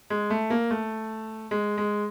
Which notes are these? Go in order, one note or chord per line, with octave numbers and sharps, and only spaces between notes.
G#3
A3
A#3
A3
G#3
G#3